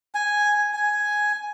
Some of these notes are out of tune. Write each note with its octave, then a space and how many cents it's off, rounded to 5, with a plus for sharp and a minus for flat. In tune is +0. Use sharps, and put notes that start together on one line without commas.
G#5 +0
G#5 +5